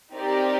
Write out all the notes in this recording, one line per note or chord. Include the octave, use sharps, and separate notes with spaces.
C4 D#4 G4 A#4 D5